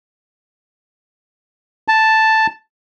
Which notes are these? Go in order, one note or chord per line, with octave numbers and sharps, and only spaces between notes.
A5